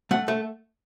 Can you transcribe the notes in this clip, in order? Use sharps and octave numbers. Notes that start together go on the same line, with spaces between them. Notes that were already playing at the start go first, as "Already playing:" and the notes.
A3 F#5
A3